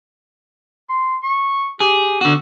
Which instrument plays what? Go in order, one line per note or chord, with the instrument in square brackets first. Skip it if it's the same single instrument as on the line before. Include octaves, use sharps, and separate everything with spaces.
[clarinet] C6
C#6
[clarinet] G4 [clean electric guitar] G#4
[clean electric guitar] D3 F#4 [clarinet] B3